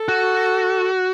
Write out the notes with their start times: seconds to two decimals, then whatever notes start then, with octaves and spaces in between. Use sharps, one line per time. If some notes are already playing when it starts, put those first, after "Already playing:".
Already playing: A4
0.08 F#4